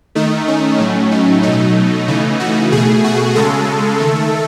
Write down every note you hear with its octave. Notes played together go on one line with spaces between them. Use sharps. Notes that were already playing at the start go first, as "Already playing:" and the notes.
D#3 A3 D#4
C#4
A2 F#3 A3
D#4
B2 F#3 A3 D#4
C#3 E3 A3 D#4
F#4
B2 A3 G#4
F#4
C#3 G#3 A4
D#3 A3